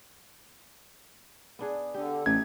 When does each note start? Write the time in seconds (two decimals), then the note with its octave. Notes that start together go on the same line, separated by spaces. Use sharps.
1.59 B3 D4 G#4
1.94 D3 G4
2.26 A1 A3 D#4 G4 G#6